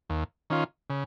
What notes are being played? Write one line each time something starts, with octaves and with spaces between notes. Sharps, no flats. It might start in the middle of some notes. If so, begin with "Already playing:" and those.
D#2
D#3 C#4 F4
C#3